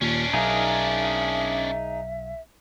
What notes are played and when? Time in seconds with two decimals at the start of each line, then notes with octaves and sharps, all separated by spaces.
0.01 D#2 A#2 C#4 D4
0.33 B1 D#4 G#4 A#4 E5 F5